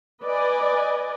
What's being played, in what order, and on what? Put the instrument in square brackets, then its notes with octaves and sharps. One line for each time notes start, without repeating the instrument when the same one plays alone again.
[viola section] B4 D5 D#5 G#5